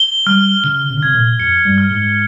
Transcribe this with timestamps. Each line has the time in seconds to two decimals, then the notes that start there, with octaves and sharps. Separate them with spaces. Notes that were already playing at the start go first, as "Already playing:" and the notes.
Already playing: G7
0.26 G3 F6
0.64 C#3 G7
0.90 C3
0.97 C#3
1.03 C3 G#6
1.14 A#2
1.40 F2 C#7
1.65 G2
1.78 F6
1.90 G#2